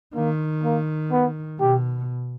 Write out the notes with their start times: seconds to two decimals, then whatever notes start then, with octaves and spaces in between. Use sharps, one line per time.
0.15 D#3 A#3
0.63 A#3
1.12 B3
1.60 B2 G4